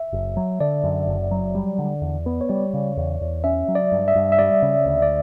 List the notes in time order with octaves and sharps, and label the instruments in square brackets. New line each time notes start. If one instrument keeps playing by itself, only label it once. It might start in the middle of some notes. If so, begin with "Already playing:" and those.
Already playing: [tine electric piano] E5
[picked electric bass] F#1
F#3
[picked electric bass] D3 [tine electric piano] D5
[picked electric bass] F#2
F#1
F#3
G3
D3
E2
B3
[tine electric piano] C#5
[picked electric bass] G3 [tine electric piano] D5
[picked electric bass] C#3
E2
E2
[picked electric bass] C#4 [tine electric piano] E5
[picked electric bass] F#3
[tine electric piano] D5
[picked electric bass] G2
[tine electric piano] E5
[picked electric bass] G2
[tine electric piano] E5
[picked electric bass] G3 [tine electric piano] D5
[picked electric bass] C#3
D2
[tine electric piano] D5